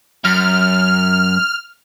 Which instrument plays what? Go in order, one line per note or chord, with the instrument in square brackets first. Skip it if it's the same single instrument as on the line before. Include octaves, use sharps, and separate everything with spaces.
[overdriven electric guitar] F#2 [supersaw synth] F6